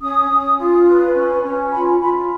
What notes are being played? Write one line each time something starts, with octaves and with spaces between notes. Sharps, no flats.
C#4 D#6
C#4
F4
B4
C#4
C#4
F4 B5
F4 B5